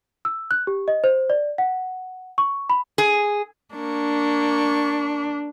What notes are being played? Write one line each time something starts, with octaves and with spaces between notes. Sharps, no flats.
E6
F#6
G4
D#5
C5
D5
F#5
C#6
B5
G#4
A#3 D4 C#6